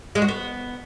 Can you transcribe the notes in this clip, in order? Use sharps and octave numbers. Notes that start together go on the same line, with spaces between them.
G#3
F#4
B3